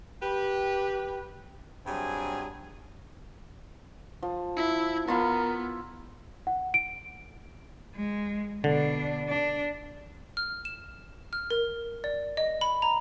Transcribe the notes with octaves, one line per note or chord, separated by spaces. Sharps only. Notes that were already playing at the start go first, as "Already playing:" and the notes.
G4 B4
G2 F#3 C4 G#4 G#5
F3
E4
B3 E4 F4 A#4
F#5
D7
G#3
B2 D3 D4
D4
F6
E7
F6
A#4
D5
D#5
B5
A#5